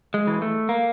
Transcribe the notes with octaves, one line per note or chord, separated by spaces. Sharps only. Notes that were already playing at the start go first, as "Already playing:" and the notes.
G#3
E3
A3
A#3